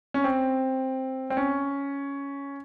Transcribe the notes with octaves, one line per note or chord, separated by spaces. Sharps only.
C#4
C4
C4
C#4